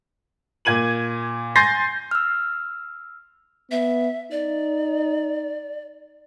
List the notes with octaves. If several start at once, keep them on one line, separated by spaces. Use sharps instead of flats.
A#2 G#6 D#7 F#7
G#5 C6 G6 A6 A#6 C7
E6 F6
B3 E5
D#4 D5